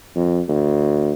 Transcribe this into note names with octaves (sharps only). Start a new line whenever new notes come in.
F2
D2